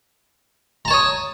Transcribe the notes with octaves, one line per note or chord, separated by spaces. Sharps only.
C#5 A5 A#5 D#6